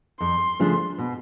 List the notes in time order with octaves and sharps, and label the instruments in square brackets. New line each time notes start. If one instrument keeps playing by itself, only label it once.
[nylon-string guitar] F2 [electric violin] C6
[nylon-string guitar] C#3 F3 A3 D4
B2